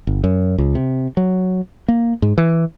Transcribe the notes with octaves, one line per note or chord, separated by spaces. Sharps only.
G1
F#2
C#2
C3
F#3
A#3
G#2
E3